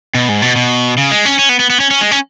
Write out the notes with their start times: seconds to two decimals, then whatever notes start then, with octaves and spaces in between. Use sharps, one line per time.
0.15 B2
0.29 G#2
0.42 B2
0.56 B2
0.97 C#3
1.11 G#3
1.25 C#4
1.39 C#4
1.49 B3
1.59 B3
1.70 B3
1.80 C#4
1.91 C#4
2.01 G#3
2.11 C#4